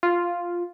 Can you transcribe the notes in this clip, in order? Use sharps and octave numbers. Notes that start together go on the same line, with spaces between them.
F4